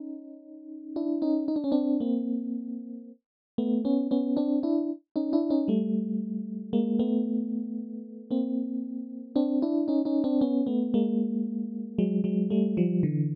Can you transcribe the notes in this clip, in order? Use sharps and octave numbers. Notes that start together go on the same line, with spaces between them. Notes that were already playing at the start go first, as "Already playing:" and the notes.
Already playing: C#4 D#4
D4 E4
C#4 D#4
D#4
D4
C#4
C4 D4
A#3 C4
A3 B3
B3 C#4
B3 C#4
C4 D4
D4 E4
C#4 D#4
D4 E4
C#4 D#4
G3 A3
G#3 A#3
A3 B3
A#3 C4
C4 D4
D4 E4
C#4 D#4
C#4 D#4
C4 D4
B3 C#4
A3 B3
G#3 A#3
F#3 G#3
F#3 G#3
G3 A3
F3 G3
D3 E3